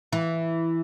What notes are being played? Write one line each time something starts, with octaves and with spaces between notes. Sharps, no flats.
E3